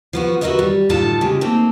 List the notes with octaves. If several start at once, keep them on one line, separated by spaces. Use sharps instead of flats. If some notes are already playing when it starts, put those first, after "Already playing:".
F3 B3 F#4
F#4 G4 A#4 B4 D#5 E5
G3
D2 A2 D#4 F4 A4 A5
C#3 G#3 F4 G4
A3 A#3 C4 D#4